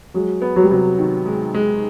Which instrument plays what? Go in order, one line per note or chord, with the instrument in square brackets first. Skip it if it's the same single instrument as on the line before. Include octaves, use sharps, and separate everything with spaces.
[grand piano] F#3 [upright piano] G#3
[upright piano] B3
[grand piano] F#3
G3
[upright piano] C3 [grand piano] F#3
[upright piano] D#3
G#3
G#3